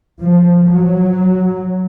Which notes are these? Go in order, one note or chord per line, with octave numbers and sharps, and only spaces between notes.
F3
F#3